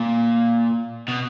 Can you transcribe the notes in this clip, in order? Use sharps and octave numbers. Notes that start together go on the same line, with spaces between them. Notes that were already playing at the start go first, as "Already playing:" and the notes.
Already playing: A#2
B2